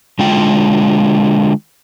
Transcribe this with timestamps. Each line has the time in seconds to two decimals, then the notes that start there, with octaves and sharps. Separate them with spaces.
0.19 D3 G#3 F4 G5